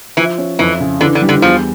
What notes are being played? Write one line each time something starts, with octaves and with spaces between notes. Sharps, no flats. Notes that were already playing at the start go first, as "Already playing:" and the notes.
E3 F3
C#4
F2 E3
C#3
D3 E3
D3
G3
D3
E2 F3